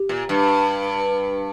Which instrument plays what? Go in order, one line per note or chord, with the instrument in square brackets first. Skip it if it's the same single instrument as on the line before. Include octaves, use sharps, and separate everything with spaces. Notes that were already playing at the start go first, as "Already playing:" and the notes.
Already playing: [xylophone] G4
[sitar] A#2
G2